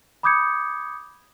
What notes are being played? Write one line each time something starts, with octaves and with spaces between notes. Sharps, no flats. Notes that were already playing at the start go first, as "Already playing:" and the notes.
B5 D6 D#6 G6 G#6 C#7